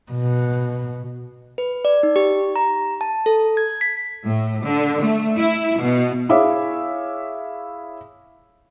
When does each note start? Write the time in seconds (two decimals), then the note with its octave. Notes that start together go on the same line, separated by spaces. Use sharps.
0.12 B2
1.58 B4
1.85 D5
2.03 D#4
2.16 G4
2.56 A#5
3.01 A5
3.26 A4
3.57 G#6
3.81 B6
4.26 A2
4.66 D3
5.01 A3
5.38 E4
5.81 B2
6.29 E4 G#4 C#5 E5 F5 D6